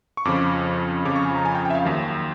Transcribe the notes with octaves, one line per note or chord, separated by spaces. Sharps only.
C#6
F2 C#3 F3 D6
F2 C#3 F3 D6
C#6
G#5
A#5
G#5
G5
G5
E5
F5
D#2 D#3 F#3